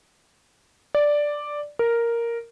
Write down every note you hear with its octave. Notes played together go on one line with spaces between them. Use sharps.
D5
A#4